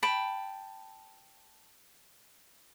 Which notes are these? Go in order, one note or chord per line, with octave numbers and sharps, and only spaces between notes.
G5 A5 B5